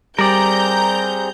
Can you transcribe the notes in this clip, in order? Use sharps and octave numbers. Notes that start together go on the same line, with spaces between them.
G3 C4 G#4 A#4 D5 A#5 G6